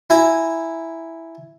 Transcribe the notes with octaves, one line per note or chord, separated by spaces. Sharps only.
E4 G#5 A#5